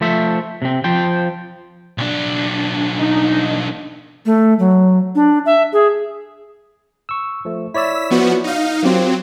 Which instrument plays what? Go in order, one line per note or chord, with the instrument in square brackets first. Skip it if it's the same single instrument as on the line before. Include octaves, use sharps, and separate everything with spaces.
[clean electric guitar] F3 A3 C5 E5
C3 C4
F3 C5 G5
[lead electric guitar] B1 D4
[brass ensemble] D#4
[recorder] A3
F#3
D4
E5
G#4
[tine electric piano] C#6 E6
F3 A3
[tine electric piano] E4 C#5 D5 [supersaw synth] E6 B6
[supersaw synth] F3 B3 F#4
D#4 F5
[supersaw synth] F#3 C4 [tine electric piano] F4 G4 A#4